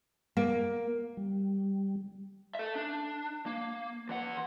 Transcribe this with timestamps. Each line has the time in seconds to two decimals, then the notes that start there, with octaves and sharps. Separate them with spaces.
0.37 A#3
1.17 G3
2.55 A4 E5
2.75 D4
3.46 A#3
4.09 E3 F#5